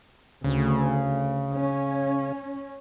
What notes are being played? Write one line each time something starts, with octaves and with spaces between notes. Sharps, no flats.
D2 C#3
C#4